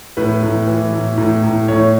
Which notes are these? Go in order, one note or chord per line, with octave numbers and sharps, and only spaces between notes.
A2 B4
A2
E3
A2
A2
A2
A2 C#5